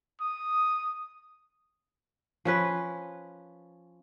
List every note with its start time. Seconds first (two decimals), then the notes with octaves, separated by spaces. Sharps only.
0.21 D#6
2.45 F3 C#4 B4